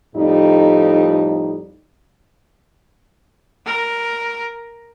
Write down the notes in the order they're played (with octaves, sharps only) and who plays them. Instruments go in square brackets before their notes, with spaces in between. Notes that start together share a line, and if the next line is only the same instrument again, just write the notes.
[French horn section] F2 A2 G3 D#4
[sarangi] A#4